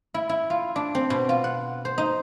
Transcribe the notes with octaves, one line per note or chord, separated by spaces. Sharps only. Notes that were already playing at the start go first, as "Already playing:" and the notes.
E4
E4
F4
D4
C4
B2
F4
F#5
C5
D#4